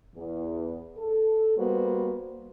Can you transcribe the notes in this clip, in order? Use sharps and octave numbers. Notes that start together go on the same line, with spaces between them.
E2
A4
G3 A#3 B3 F#4 B4 C5